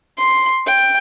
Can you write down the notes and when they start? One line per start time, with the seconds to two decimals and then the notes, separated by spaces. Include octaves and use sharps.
0.18 C6
0.67 G5